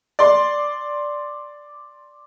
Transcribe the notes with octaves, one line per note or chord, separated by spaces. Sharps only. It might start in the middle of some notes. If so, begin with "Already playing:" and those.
D5 C6